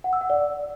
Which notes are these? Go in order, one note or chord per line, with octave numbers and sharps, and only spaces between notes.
F#5
E6
F#5
D5